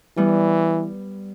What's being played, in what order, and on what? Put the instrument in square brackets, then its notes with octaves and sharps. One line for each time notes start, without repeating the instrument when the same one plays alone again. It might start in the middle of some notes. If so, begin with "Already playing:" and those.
[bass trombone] E3 [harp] G3 B3